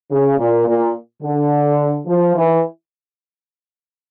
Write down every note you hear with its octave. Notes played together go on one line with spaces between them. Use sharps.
C#3
A#2
A#2
D3
F3
E3